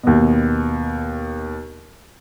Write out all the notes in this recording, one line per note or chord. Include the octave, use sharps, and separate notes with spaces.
D#2 B2